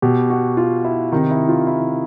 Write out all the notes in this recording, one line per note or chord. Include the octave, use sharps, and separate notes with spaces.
B2 G4
F#4
F4
E4
C3 D#3 D#4
E4
F4
E4